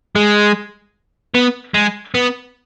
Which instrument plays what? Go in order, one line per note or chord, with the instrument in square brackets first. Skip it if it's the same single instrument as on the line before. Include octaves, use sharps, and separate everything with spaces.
[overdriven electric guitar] G#3
B3
G#3
B3